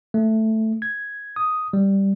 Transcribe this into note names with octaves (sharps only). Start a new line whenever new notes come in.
A3
G#6
D#6
G3